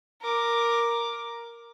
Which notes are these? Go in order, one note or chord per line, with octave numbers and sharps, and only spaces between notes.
A#4 D6